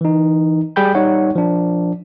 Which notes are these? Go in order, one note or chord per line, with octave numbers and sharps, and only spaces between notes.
E3 D#4
G3 G#4 G5 B5 G6
G3 D#4 C#5 F#5
F3 D4